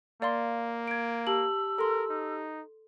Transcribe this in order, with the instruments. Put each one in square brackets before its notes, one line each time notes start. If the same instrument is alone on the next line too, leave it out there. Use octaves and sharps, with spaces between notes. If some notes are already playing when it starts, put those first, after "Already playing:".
[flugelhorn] A#3 [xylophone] D5 F5 C6
[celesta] G#6 D7
[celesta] G4 A5 F#7 [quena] E6
[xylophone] A4 C6 [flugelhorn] A#4
[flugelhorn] D#4